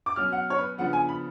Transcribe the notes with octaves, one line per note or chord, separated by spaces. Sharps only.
D6
B2 F#3 C#4 F6
F#5
C#5
B4
C#3 F3 B3 D4 F#5
G#5
B5